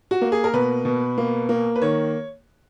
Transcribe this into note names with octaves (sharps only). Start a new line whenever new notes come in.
F#4
A#3
G#4
A#4
B2 B4
B2
A#3
A#3
B4
D#3 C#5